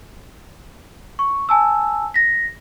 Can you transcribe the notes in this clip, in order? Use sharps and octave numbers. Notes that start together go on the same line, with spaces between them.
C#6
G#5 A5 E6
A#6 B6